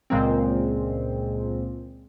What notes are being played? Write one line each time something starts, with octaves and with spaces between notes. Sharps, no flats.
C#2 A#2 G#3 A#3 C4